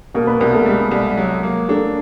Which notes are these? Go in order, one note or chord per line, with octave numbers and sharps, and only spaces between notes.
B2 A#3 A#4
B3 B4
C2 A#3 A#4
A3 A4
G3 G#3 G#4
C2
F#3
A#3
A3 D4 A4